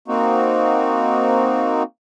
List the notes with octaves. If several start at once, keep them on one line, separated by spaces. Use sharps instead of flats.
A#3 C4 D#4 F#4